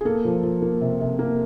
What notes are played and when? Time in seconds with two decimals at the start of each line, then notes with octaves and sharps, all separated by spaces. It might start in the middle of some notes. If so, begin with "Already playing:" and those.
0.01 G#4
0.05 A#3 A4
0.25 F3
0.43 F3
0.62 A#3
0.81 C3
1.00 C3
1.19 A#3